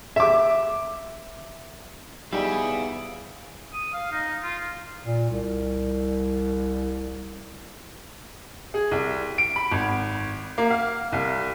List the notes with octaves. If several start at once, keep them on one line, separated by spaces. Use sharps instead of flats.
E5 D6
G3 B3 D#4 E4 G4 G#4 F5 G#5
D#6
F5
D#4
F4
A#2
C2
G#4
C2
D7
B5
G#1
A#3
F5
C2